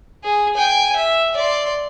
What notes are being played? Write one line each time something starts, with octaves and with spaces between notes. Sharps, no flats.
G#4
G5 G#5
E5
D5 C6